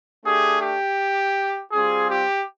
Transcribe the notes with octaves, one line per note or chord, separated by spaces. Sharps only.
A3 D4 G4 G#4
G4
G3 C4 F4 G#4
G4